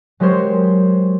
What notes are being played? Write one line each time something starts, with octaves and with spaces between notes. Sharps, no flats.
F#3 G#3 G4 A#4 C5 C#5